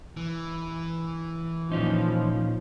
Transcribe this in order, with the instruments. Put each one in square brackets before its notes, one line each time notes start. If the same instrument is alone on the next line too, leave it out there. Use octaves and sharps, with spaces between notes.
[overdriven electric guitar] E3
[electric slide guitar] A#2 C#4 D#4 [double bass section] F3